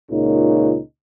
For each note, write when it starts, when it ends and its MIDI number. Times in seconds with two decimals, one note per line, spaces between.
0.11 0.78 37
0.11 0.78 46
0.11 0.78 49
0.11 0.78 63